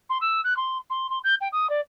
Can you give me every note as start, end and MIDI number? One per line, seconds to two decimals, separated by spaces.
0.10 0.18 84
0.21 0.41 88
0.44 0.56 90
0.57 0.78 84
0.90 1.10 84
1.10 1.19 84
1.24 1.35 91
1.41 1.48 79
1.52 1.69 87
1.70 1.81 74